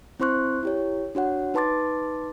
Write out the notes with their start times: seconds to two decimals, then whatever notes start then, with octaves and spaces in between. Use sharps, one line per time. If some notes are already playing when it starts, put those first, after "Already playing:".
0.20 C4 E4 C5 C6 C#6 F#6
0.63 E4 G4 C#5
1.15 D4 F#4 C#5 F#5
1.54 D#4 B4 A5 C6 D6 A6